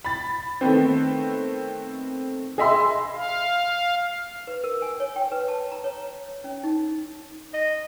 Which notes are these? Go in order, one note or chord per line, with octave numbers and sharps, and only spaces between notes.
B5 A6
D#3 A3 B3 C4
G#4 D#5 E5 B5 C6 E6
F5
B4
A#4
G#5
C#5
G5
B4
A5
A#5
C#5
C#4
D#4
D#5